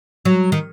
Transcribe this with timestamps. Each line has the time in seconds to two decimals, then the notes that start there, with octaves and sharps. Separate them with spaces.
0.25 F#3
0.52 D#3